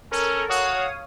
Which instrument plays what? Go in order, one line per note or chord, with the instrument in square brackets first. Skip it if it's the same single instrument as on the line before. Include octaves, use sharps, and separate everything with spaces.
[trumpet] C#4 [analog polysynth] A4 A#4
[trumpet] F#4 [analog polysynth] C#5 F5 D#6